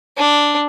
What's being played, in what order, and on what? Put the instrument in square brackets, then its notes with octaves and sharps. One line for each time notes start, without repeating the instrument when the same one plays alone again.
[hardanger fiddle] D4